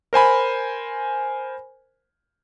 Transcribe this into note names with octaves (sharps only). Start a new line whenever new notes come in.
A#4 C5 G#5 B5